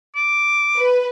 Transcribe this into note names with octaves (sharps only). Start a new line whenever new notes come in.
D6
B4